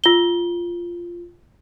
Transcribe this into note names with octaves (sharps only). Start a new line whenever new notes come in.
F4 G7